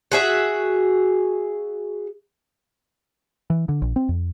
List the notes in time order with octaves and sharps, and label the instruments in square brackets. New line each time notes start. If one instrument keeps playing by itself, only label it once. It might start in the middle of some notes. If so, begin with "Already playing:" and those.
[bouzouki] F#4 G#4 E5
[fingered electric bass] E3
D3
A#1
C4
F2